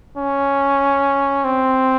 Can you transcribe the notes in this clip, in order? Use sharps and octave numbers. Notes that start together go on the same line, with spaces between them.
C#4
C4